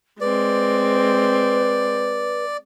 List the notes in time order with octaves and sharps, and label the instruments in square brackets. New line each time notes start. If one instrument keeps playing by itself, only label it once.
[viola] G#3 C4 [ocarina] B4 [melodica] D5